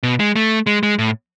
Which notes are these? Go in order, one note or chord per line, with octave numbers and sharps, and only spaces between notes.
B2
G#3
A3
G#3
G#3
A2